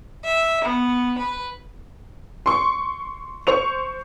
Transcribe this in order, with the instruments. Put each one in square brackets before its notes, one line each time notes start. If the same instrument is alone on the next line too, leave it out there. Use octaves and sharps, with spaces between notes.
[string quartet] E5
B3
B4
[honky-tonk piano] C6 C#6
C5 C#6 F7